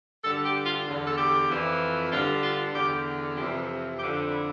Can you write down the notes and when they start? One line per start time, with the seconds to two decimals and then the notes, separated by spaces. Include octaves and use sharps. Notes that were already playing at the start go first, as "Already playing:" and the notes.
0.24 G2 D3 A4
0.45 G4
0.65 F4
0.86 E2 D3
1.07 A4
1.18 G4
1.49 F2 E3
2.11 G2 D3 F4
2.43 F4
2.74 E2 D3 G4
3.36 F2 C3 E3 G4
3.98 F2 G4
4.03 D3
4.14 F4
4.30 E4